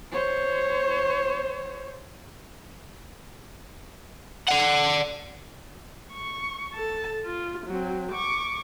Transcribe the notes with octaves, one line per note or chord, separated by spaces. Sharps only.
C5 C#5
D5 F#5
C#6
A4 A5
F4
F#3 C4
C#6 D6